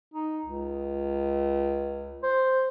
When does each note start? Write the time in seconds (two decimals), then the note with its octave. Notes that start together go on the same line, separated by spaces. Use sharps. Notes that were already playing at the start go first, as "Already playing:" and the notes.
0.14 D#4
0.45 C#2
2.23 C5